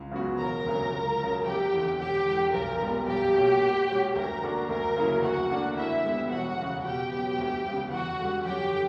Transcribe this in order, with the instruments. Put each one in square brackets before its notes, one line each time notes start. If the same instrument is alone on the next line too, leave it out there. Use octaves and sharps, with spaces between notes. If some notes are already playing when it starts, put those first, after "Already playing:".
Already playing: [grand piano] C#2
C#3 F#3 B3 F#4
[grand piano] E1 [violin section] A#4 A#5
[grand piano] D2 C#3 F#3
C#2
C#3 F#3
[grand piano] F#1 [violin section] G4 G5
[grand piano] E2 D3
[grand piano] E1 [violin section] G4 G5
[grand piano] E2 D3 G3
[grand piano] B1 [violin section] A#4 A#5
[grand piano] A#2 G3 B3
[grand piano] B1 [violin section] G4 G5
[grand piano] B2 A#3 C#4 F#4
A#2
G3 C#4 F#4
[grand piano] D2 [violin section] A#4 A#5
[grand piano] D3 A#3 D4 F#4
[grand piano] D2 [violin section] A#4 A#5
[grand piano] C#3 F#3 A#3 E4
[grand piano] D2 [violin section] F#4 F#5
[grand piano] D3 A#3 D4 A#4
[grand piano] D2 [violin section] E4 E5
[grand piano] D3 G3 B3
[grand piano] E1 [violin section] F#4 F#5
[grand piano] E2 C#3
[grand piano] B2 [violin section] G4 G5
[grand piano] F#3 B3
D2
C#3 G3 B3
[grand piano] E2 [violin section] F#4 F#5
[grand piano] D3 G3
[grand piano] F#2 [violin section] G4 G5
[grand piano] D3